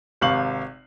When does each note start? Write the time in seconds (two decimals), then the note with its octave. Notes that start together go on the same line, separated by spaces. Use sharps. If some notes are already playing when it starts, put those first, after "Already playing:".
0.21 G#1 C3 F5 C#6 F#7